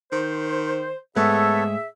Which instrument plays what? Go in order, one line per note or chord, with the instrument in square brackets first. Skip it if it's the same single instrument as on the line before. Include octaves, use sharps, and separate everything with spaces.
[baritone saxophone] D#3 [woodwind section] C5
[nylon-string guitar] G#2 G#3 A3 [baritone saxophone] B3 [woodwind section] G#4 E5 [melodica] A4 C#5